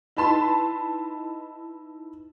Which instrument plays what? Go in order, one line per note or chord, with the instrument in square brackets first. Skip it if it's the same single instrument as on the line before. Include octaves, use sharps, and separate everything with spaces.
[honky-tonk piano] D#4 E4 B4 A5 B5 C6